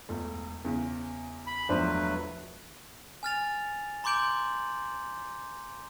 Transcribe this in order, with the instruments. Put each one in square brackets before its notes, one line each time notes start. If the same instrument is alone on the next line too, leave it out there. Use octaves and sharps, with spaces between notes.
[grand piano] E1 A3
E2 C#3
[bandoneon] B5
[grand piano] E1 C5 [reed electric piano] F3 D4 F4 [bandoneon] F#3 A3 B4
[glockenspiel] G#5 F6 A6 F7
A#5 C6 D6 G6 D7 F#7